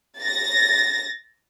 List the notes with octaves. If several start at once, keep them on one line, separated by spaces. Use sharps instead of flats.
A6 A#6